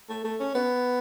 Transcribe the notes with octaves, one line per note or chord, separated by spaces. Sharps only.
A3
A3
C#4
B3